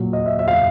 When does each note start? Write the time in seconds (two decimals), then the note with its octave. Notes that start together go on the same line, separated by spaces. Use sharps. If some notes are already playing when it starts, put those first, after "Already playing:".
Already playing: A#2 F#3
0.13 D#5
0.26 E5
0.39 E5
0.48 F5